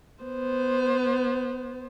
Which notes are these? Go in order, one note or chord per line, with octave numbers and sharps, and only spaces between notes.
B3 C5